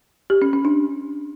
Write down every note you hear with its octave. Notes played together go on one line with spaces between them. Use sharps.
G4
C#4
C#4
D4